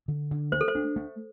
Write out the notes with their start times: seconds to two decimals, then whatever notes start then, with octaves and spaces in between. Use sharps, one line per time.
0.08 D3
0.31 D3
0.52 A3 C5
0.61 A4
0.68 C5
0.75 D4
0.96 A3